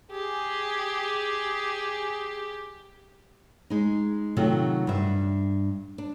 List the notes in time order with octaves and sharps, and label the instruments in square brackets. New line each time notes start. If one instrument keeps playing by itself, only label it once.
[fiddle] G4 [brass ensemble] G#4
[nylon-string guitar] G#3 D#4
C3 D#3 F#3 A3 F4 F#4
G2 E5
D4